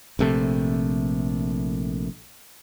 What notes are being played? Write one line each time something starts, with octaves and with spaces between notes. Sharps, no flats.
A#1 C3 A3